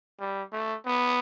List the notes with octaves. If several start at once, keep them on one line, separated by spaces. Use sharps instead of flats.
G3
A3
B3